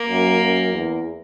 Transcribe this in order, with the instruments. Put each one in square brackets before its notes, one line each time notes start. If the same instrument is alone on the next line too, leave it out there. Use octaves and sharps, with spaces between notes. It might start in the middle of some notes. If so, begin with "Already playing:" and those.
Already playing: [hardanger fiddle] A#3
[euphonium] F#2
F#2
E2